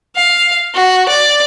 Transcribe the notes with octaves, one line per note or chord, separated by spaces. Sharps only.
F5
F#4
D5